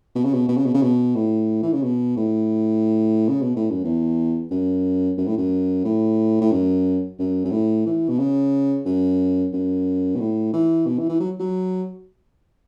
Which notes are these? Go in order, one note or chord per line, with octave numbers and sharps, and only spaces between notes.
B2
C#3
B2
B2
C#3
B2
C#3
B2
A2
E3
C#3
B2
A2
C#3
B2
A2
F#2
E2
F#2
F#2
A2
F#2
A2
A2
F#2
F#2
F#2
A2
E3
B2
C#3
F#2
F#2
B2
A2
E3
B2
E3
E3
F#3
F#3